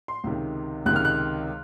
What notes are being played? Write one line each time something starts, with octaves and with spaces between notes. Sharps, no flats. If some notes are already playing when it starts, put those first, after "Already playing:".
C6
C#2 C3 D#3
C#2 C3 D#3 F#6
F6
F#6